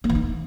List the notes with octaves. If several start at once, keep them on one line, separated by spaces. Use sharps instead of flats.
A#3
E3
D#4